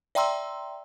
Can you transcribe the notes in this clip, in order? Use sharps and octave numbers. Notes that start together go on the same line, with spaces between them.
D5 E5 G5 A#5 C6 E6